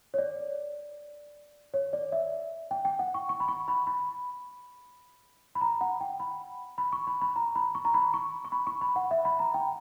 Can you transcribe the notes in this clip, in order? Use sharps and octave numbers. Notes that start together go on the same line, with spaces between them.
C#5
D5
C#5
D5
E5
G5
G5
F#5
C#6
C#6
B5
C#6
B5
B5
B5
A#5
F#5
G5
B5
B5
C#6
B5
B5
A#5
B5
C#6
A#5
B5
C#6
C#6
B5
C#6
B5
F#5
E5
B5
A#5
G5